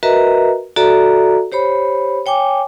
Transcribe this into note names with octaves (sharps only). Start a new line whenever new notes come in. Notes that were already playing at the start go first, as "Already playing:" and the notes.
F#4 A#4 B4 D#5 E5 A#5
F#4 A4 D5 E5 A#5
G4 C5 C#5 B5
C#5 G5 G#5 D6